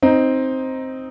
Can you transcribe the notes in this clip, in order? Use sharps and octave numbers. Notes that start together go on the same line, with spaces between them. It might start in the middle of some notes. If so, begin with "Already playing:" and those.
C4 D#4